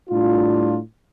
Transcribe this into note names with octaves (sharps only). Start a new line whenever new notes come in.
A2 G3 D4 F4